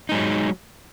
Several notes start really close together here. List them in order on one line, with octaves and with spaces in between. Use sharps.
D#4 G#3 F#3